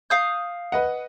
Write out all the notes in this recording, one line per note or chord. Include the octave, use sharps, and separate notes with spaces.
F5 D#6 G6
B4 D#5 F#5